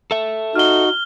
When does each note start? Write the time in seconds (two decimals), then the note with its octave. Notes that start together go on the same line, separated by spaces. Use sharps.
0.11 A4 E5
0.56 D#4 F#4 F6 G7